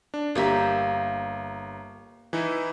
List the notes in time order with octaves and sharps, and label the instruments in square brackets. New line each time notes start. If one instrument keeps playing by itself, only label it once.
[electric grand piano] D4
[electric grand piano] G1 A#5 [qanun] A#3 G4 E5
[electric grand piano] E3 D#4 E4